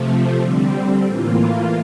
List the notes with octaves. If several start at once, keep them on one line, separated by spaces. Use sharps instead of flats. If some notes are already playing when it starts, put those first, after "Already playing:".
Already playing: C3 F3 A3
D3 G3 C4
A2 E3 A#3 F4